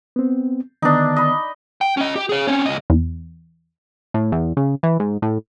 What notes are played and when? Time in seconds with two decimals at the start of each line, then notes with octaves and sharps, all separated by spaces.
0.16 B3 C4
0.82 D3 D#3 B3 D4 D#4
1.16 D#5 B5
1.81 G5
1.97 C#4 D#5
2.16 G4
2.29 G#4 C#5
2.47 C4 C#4
2.66 C#2 D#5
2.90 E2
4.14 A2
4.32 E2
4.57 C#3
4.83 E3
5.00 G#2
5.22 A2